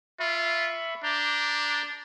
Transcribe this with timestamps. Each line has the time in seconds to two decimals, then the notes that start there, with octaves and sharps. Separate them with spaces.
0.20 F4 E5 B5 C#6
1.03 D4 A#5 D6 G6